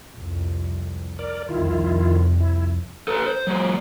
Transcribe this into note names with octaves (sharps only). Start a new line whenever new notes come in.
C2 F2
A#4 D5
C2 F2 D#3 E4 F4
E4
A4 B4
C5
F#3 G#3